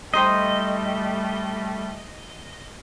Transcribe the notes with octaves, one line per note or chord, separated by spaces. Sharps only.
G3 A3 D#4 C5 D#5 G5